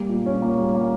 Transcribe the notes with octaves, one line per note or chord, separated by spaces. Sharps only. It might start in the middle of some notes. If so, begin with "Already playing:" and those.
Already playing: G3 A#3
A#2
C#4
A#3
G3
A#3